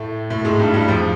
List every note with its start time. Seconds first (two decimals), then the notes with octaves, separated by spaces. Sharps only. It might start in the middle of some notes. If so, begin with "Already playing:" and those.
Already playing: A2 A3
0.30 A2 A3
0.45 G#2 G#3
0.59 G2 G3
0.74 G2 G3
0.88 F2 F3